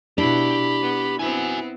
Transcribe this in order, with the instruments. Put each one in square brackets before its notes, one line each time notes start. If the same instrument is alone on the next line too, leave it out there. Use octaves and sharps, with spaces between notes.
[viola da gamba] B2 E4 [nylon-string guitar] D4 [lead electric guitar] G4 [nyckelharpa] B5
[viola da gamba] B3
[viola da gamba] B3 C4 [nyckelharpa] E4 [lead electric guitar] F#4 G#5